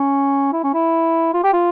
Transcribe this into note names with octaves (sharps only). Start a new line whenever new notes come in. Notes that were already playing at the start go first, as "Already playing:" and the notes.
Already playing: C#4
E4
C#4
E4
F4
G4
F4